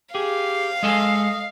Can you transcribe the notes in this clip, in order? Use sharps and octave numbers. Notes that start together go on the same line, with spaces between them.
G4 G#4 F5
G#3 A4 D#5 G#5